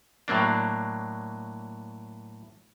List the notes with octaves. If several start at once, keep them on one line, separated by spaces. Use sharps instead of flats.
A2 F#3 A#3 D4